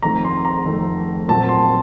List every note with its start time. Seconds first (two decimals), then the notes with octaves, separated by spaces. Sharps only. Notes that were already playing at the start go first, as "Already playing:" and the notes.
0.02 F2 D#3 A3 C4 A#5
0.25 C6
0.45 A#5
0.65 F2 D#3 A3 C4
1.28 A#2 F#3 C4 A5
1.49 C6